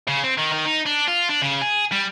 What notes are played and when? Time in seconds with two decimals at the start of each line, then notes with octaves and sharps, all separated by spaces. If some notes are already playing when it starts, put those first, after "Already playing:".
0.08 C#3
0.24 C4
0.38 D#3
0.53 D#3
0.66 D#4
0.86 D4
1.08 F4
1.29 D4
1.42 C#3
1.62 G#4
1.92 G3